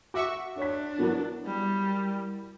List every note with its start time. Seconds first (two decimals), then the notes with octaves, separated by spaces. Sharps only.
0.14 F#4 E5 C#6 D6
0.57 D4 C#5 B6
0.98 F#3 B3 E4 F#4 A#4
1.46 G3